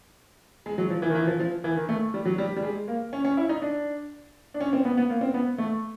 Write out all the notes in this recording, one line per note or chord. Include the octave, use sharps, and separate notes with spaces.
G#3
F#3
F3
E3
D#3
E3
F3
F3
E3
D#3
A3
G3
F#3
G3
G3
G#3
A#3
C#4
C#4
E4
D#4
D4
D4
C#4
C4
B3
B3
A#3
C4
B3
A3